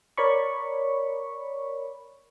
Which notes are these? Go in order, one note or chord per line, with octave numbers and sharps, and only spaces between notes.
A#4 C#5 D5 B5 C#6